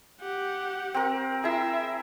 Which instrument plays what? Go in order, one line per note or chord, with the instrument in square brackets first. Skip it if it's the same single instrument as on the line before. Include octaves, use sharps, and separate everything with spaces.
[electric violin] G4 F#5
[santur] C4 A#4
[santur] E4 G#4 [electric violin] E5